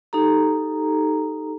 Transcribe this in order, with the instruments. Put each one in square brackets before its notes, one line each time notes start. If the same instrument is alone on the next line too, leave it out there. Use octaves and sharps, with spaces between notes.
[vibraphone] D#4 G4 A4 A#5